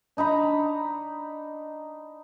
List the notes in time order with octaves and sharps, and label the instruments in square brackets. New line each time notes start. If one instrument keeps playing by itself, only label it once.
[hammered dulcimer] D4 D#4 A#5 B5